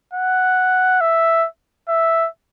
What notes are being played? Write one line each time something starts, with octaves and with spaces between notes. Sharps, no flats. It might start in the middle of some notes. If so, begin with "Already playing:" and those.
F#5
E5
E5